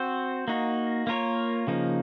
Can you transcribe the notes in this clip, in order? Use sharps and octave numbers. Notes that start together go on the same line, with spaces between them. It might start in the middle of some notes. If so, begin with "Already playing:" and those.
Already playing: C4 F#4 C5
A#3 D#4 F#4
A#3 F4 A#4 C#5
C#3 F3 A#3 D#4